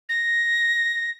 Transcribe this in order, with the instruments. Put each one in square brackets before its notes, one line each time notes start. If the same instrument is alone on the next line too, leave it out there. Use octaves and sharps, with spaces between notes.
[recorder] A#6